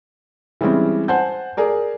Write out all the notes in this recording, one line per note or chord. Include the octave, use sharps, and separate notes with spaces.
E3 G3 G#3 C4 C#4 E4
C5 F#5 G#5 A5 G6
G#4 A#4 D5